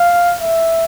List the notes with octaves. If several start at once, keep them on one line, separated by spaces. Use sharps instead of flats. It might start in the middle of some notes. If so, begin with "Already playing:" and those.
Already playing: F5
E5